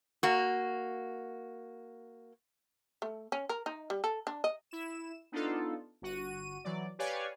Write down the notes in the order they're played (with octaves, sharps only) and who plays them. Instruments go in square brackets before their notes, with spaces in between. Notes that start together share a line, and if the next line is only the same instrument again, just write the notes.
[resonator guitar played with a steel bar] A#3 F#4
[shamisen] A3
C#4
A#4
D#4
G3
A4
D4
D#5
[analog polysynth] E4 E7
B3 D4 D#4 F4 A4
G1 F#4 D#7
E3 F#3 D5
G4 B4 C#5 D5 F5 G#5